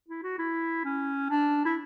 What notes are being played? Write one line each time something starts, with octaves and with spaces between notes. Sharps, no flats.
E4
F#4
E4
C#4
D4
E4